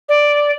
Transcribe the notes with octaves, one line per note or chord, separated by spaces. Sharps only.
D5